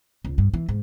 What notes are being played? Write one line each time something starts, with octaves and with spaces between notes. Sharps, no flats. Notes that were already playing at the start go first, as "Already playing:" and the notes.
C#2
G2
E3
G#2